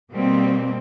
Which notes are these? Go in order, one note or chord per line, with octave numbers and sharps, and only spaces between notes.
B2 G3 A#3 C4